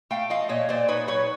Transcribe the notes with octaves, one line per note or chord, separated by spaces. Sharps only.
A3 F5 G5
F3 D#5 F5
A#2 C#5 D#5
A#2 C5 D5
D#4 B4 C#5
F#3 B4 C#5